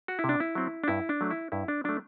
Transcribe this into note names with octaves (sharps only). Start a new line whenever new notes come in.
F#4
E4
C3
D4
E4
F#3 C4
D4
G2 E4
D4
F#3 A3
E4
G2 E4
D4
F#3 A3 D4